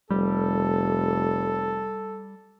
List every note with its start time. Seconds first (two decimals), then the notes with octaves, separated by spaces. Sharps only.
0.10 F1 G3 A4